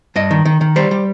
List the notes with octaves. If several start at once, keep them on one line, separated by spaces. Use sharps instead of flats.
G2 D#5
D#3
D#3
D#3
G3 C5
G3